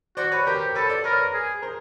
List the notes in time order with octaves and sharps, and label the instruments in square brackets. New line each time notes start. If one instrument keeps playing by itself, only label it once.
[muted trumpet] F#4 [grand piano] C5 D5
[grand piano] B4 C#5
[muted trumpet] G4 [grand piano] A#4 C5
[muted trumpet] A4 [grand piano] B4 C#5
[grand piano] C5 D5
[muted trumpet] A#4 [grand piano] B4 C#5
[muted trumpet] G#4
[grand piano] A#4 C5